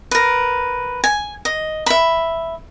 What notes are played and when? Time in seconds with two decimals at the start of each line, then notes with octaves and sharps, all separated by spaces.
0.11 A#4 B4
1.04 G#5
1.45 D#5
1.86 E5 B5